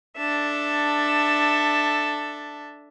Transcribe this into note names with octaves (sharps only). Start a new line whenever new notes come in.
D4 A4 E5